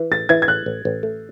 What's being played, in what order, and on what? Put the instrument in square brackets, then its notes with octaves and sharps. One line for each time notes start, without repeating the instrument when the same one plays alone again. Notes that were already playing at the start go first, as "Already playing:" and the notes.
Already playing: [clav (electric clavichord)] E3
[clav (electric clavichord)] A1 [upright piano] A6
[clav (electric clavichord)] E3 [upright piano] G#6
[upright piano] G#6
[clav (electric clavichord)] A1 [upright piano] F#6
[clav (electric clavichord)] A1
A1
A3